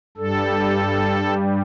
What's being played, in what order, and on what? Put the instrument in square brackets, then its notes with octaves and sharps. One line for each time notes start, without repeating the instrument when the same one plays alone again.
[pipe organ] G2 G3 A4